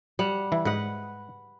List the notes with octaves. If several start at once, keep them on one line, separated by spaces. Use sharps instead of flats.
G3 F#5
E3 E4
G#2 B4 D#5 F#5